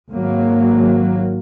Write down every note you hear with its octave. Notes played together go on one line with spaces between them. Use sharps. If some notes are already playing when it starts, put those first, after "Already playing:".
G#1 F#3 A#3